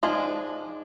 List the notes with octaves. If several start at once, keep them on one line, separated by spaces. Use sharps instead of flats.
F3 G#3 D4 D#4 G#4